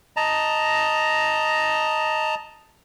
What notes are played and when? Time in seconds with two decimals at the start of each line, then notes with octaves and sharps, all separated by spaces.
0.17 D#5 A5 A#5